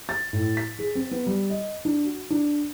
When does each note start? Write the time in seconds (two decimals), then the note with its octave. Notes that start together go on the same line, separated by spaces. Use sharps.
0.09 A6
0.33 A2
0.57 B6
0.79 G#4
0.95 C4
1.11 B3
1.26 G3
1.50 D#5
1.85 D4
2.05 F#4
2.30 D4